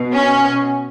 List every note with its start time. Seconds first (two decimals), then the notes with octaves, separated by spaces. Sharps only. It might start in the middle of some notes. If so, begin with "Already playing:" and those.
Already playing: B2
0.14 C#4